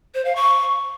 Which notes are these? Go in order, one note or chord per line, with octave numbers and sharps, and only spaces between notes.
C5
F5
C#6